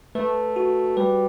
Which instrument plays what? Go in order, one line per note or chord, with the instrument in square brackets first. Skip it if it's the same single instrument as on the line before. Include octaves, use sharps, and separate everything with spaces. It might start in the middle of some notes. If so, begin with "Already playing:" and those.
[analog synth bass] A3 [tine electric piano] B4
[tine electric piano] F#4
[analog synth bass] G3 [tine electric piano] B4